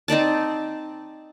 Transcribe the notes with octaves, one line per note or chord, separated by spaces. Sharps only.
C4 D#4 D5 A5